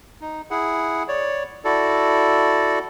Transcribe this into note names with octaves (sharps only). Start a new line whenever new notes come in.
D#4
E4 G#4 F#5
C#5 D5
E4 F#4 A4 D5